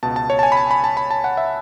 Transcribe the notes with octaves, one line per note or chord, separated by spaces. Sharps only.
C#2 B2 A5
A5
C#5
A5
G#5
B5
A5
B5
A5
B5
A5
F#5
E5